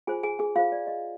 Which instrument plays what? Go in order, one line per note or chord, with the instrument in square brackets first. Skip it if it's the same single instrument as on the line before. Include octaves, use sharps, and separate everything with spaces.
[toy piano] F4 G#4 C5 G#5
G#4 G#5
G#4 G#5
F4 G#4 C5 F5
D5
D#5